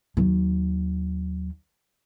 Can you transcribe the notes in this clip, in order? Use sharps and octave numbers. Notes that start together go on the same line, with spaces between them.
D#2 F#3